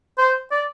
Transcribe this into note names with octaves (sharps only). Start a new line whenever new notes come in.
C5
D5